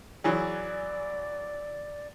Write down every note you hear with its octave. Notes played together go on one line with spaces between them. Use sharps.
E3 F#3 G#4 D5